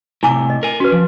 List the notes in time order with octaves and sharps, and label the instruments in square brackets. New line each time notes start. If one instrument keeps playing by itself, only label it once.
[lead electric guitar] A2 C3 [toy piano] E4 G#5 D6
[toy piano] D#5
[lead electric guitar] A#4 G#5
[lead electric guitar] C#4 [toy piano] F#4 B4
[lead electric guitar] F3